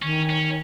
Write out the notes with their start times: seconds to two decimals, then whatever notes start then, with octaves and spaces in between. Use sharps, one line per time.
0.02 D#3 C#4
0.30 C#4